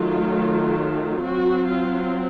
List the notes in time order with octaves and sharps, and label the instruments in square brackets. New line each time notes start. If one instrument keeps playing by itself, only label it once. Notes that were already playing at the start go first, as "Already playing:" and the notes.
Already playing: [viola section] D#3 F#3 A3 F4
F#3 C4 F#4
F4